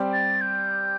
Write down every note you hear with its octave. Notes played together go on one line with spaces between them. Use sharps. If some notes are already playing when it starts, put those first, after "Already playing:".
Already playing: G3 C4 G4 D5
A6
G6